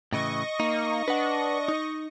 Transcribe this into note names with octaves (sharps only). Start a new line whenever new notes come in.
A2 C#3 E3 D#5 C#6 A#6
A#3 D#4
D4 B4 F#5
D#4